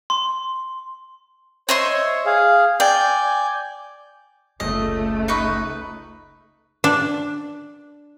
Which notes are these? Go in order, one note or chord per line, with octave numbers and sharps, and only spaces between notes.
C6
C5 C#5 D#5 E5 C6
C#5
G#4 F5
D5 G5 G#5 G6
F#1 C#2 G#3 A3 D#5
D#4 B4 C#6
D4